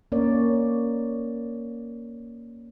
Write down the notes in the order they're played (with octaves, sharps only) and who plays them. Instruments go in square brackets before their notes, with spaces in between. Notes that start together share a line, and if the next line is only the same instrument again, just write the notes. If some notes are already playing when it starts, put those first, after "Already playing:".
[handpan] A#3 C#4 A#4 C#5 D5